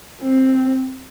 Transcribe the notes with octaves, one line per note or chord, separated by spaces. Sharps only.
C4